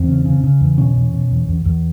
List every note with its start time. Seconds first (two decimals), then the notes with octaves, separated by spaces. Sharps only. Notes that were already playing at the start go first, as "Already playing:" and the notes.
Already playing: E2 C4
0.08 C#3
0.25 C#3
0.44 C#3
0.61 E2
0.78 B2 C#4
0.96 E2
1.13 B2
1.31 E2
1.48 E2
1.65 E2